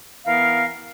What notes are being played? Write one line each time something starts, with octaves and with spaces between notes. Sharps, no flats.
E3 B3 A#4 F5